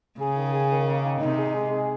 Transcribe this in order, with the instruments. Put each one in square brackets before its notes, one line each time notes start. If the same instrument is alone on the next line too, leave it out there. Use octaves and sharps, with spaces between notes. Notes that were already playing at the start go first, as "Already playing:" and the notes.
[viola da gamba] C#3 [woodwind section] G#4
[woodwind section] D#3
G#4
D#3
A#3
D#3
[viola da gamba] C3 [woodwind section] D#4
[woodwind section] G#4
G#3
G#4